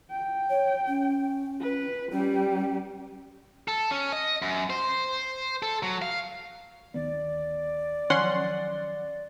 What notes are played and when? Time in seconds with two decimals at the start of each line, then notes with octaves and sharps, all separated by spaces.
0.11 G5
0.50 C#5
0.88 C#4
1.61 B4
2.12 G3 C#4 G4
3.68 A4
3.91 C#4
4.13 D#5
4.42 F#2
4.70 C5
5.63 A4
5.83 F#3
6.02 F5
6.94 D1 D#3 B3 D5
8.10 D#3 F3 F#3 C#4 F#5 C6